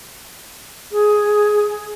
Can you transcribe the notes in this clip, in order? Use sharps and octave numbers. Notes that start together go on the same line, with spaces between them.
G#4